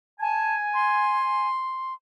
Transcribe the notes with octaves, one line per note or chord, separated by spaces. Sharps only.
G#5 A5
C6